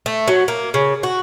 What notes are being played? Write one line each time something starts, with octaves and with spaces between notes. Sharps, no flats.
A3
F#3
A#3
C#3
F#4